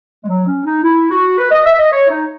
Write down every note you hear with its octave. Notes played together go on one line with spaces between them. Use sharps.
G#3
F#3
C#4
D#4
E4
F#4
B4
D#5
E5
D#5
C#5
E4
D#4